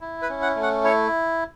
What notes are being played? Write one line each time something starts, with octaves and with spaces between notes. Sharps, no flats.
E4
B4
C#4
F#5
A3
F#5
E4 C#5